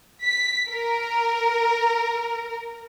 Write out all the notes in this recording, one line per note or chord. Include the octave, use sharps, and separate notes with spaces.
B6
A#4